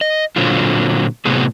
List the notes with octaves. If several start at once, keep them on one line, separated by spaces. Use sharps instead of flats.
D#5
A#2 D3 F#3 C4 F4
A2 C3 F#3 B3 G#4